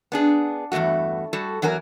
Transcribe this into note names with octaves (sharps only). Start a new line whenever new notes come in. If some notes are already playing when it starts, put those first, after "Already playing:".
B3 D4 G#4
E2 G2 B2 A3 F#4
G3 F#4 A4
E2 F#3 F#4 A#4 G#5